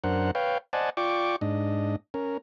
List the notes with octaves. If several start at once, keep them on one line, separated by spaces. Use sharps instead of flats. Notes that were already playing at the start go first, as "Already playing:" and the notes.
F#2 D4 A#4 C5 F#5
B4 C#5 F5 G5
C5 D5 D#5 F#5 G#5 A5
F4 D5 G5 C#6 D6
G#2 D4 D#5
C#4 A#4